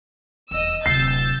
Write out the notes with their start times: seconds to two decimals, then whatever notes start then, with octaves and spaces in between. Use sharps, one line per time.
0.51 D#1 E2 D#5 E6
0.86 D1 C3 E6 G6 A6 C7